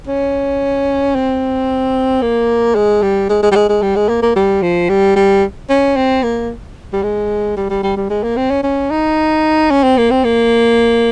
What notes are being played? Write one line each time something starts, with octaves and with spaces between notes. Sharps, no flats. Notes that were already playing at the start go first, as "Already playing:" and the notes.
C#4
C4
A#3
G#3
G3
G#3
G#3
G3
G#3
G#3
G3
G#3
A#3
A#3
G3
F3
G3
G3
C#4
C4
A#3
G3
G#3
G3
G3
G3
G3
G#3
A#3
C4
C#4
C#4
D#4
C#4
C4
A#3
C4
A#3